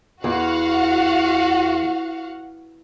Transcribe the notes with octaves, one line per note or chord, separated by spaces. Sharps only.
E2 F#4 F5 F#5